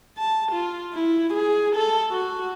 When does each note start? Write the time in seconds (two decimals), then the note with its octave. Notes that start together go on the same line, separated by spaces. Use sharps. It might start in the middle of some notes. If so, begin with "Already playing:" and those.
0.18 A5
0.52 F4
0.94 E4
1.34 G#4
1.76 A4
2.11 F#4